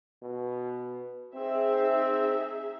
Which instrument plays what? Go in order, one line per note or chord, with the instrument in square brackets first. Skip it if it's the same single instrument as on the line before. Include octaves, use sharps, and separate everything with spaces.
[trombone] B2
[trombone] C4 [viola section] D#4 G#4 E5